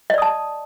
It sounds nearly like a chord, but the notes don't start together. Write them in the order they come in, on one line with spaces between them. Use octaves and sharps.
D#5 D5 D#6 A5